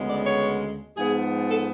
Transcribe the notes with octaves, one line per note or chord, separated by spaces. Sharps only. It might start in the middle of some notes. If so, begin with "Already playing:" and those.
Already playing: D2 C#3 G#3 B3
D5
C#5
G#2 F3 B3 G#4
A4